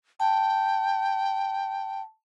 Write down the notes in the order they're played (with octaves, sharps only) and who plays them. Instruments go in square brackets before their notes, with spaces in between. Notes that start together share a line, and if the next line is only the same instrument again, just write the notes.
[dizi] G5 [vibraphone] A5